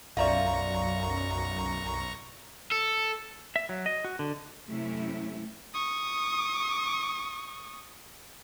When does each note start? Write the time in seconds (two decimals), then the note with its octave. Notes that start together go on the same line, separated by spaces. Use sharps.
0.17 B1 F#2 F4 D5 E5 F5 A#5 C#6
2.71 A4
3.56 E5
3.69 F#3
3.86 D#5
4.05 F#4
4.19 D3
4.66 F#2 C3 A3 C#4 E4
5.74 C#6 D#6